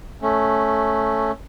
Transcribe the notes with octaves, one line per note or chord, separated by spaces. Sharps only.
A3 C#4